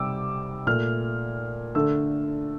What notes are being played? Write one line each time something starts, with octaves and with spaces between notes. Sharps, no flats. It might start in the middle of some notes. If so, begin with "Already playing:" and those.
Already playing: C3 G3 D6 E6
A#2 A3 F6
D3 A3 E6